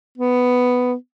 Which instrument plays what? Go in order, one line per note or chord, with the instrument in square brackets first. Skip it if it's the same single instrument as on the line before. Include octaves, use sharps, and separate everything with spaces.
[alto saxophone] B3